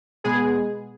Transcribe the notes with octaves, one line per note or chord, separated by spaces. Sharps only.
B2 G#3 B3 G#4